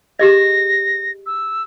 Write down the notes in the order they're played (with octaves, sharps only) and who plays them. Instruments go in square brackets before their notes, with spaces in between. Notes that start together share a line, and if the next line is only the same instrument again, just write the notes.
[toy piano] G4 G#4 D#5 [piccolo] A#6
[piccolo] E6